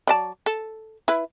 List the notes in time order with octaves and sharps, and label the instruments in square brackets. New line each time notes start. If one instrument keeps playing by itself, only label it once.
[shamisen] F#3 D5 A5
A4
E4 B4